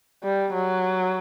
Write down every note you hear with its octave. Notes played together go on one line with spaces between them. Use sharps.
G3
F#3